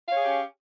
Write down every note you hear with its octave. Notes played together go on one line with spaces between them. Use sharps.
C#4 G4 G#4 C#5 F5